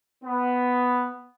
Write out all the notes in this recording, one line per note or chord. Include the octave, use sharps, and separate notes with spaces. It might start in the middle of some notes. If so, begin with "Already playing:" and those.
B3